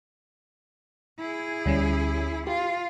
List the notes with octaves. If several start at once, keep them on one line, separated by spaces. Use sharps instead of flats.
E4 G#4
D2 G3 C#4
F4 G4